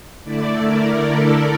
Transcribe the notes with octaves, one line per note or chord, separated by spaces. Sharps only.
D3 A3 E4 D5
A#4
A4